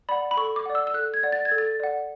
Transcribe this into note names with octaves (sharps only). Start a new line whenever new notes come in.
D5 F#5 B5
B5
A4 C#6
D6
D5 F#5
E6
E6
A4 F#6
G#6
D5 F#5
A6
G#6
A4
A6
D5 F#5